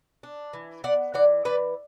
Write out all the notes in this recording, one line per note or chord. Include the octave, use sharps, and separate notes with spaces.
D4
E3
B3 D5 F#5
E3 D5 F#5
E3 B4 D5